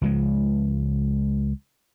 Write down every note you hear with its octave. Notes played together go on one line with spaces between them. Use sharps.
C#2 F3 G#3